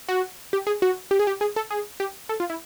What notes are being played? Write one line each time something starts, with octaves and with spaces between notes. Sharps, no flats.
F#4
G4
G#4
F#4
G4
G#4
G4
G#4
A4
G#4
G4
A4
F4
E4